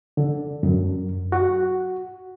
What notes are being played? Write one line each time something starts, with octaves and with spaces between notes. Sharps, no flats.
D3
F#2
F#4